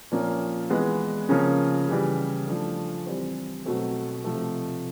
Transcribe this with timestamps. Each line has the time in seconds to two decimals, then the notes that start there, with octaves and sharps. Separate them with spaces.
0.12 A#2 F3 A#3 C#4
0.70 E3 G#3 B3
1.29 C#3 F3 A#3 C#4
1.88 C#3 E3 G3
2.47 F3 A3 D4
3.06 E3 G3 C4
3.66 B2 F#3 A3 C4
4.24 C3 F3 A3